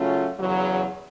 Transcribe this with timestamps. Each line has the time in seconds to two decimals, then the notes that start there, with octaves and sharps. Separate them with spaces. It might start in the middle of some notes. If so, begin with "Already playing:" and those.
Already playing: C#3 F#3 A3 C#4 F4
0.38 E2 C#3 F#3